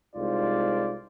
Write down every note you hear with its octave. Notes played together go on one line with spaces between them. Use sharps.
C2 G#3 D#4 F4 C5 D5